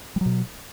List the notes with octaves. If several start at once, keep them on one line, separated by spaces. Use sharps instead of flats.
B2 F#3 G3